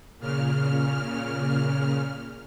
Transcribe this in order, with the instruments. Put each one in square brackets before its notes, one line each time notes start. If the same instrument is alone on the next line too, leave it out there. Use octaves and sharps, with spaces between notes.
[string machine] A#2 C#3 F6